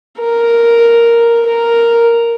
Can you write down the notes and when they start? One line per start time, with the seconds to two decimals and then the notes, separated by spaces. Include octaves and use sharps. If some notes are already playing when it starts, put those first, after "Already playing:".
0.19 A#4
1.46 A#4